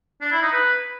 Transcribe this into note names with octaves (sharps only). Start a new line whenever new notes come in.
D4
E4
D#4
B4